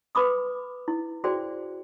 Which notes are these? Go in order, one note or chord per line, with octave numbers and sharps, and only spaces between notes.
B4 B5 D6 D#6
E4
F#4 G#4 C5 D5 G5